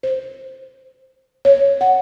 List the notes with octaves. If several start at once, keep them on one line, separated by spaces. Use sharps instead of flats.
C5
C#5
F#5